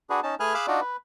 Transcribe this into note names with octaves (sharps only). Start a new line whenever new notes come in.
D4 F#4 G#4 B4
C#4 D#4 A5
A3 G#4 B4 G#5 F6 F#6
G#4 F5 B5 D6 E6 F#6
D4 D#4 F4 F#4 D5
B4